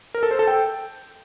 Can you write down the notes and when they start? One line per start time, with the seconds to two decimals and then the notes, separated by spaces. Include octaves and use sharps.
0.14 A#4
0.23 A4
0.31 C5
0.39 A4
0.47 G5